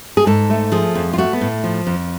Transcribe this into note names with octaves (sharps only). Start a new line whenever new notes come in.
G#4
G#2 A4
A3
F3 G#4
F2
F4
A3 F#4
B3
A2
F3
F2